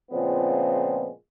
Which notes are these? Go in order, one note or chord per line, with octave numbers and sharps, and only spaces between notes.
A#2 C#3 F3 G#3 B3 C4